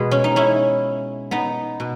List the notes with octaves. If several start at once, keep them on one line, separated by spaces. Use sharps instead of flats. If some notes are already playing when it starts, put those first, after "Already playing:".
Already playing: B2 G#3 B3
C#4
D#4
C#4 E4
B3 D#4
B2